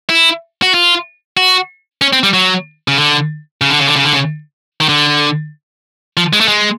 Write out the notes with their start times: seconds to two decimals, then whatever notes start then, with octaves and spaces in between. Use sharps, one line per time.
0.09 E4
0.62 F#4
0.74 F4
1.37 F#4
2.02 C#4
2.13 C4
2.23 G3
2.33 F#3
2.88 C#3
2.97 D3
3.61 C#3
3.70 D3
3.79 C#3
3.87 D3
3.96 C#3
4.05 D3
4.13 C#3
4.80 D#3
4.89 D3
6.17 F3
6.33 G#3
6.40 A3
6.48 G#3